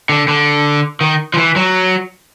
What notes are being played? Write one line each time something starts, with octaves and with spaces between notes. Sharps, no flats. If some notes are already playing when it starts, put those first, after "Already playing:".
D3
D3
D#3
F3
E3
F#3